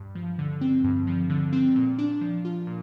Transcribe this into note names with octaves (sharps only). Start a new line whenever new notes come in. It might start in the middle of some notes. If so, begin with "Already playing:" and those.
Already playing: G2
F3
D3
C4
G2
F3
D3
C4
A#2
D4
F3
F4
A#2